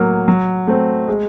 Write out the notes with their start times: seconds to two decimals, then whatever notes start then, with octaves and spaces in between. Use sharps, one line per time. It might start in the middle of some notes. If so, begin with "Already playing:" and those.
Already playing: A2 F#3 A#3
0.28 F#3
0.67 A3 C4
1.08 G#3